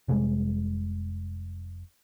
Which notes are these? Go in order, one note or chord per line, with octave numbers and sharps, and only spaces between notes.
F1 C3 G3 G#3